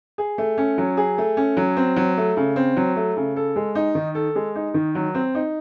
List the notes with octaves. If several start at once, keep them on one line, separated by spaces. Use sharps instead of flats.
G#4
A3
C#4
F#3
G#4
A3
C#4
F#3
C4
F#3
A3
C#3
C4
F#3
A3
C#3
A4
G#3
D#4
D#3
A4
G#3
D#4
D#3
F#3
C4
D#4